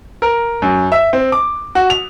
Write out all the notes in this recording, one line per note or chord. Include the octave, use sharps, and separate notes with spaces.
A#4
F#2
E5
C4
D6
F#4
F7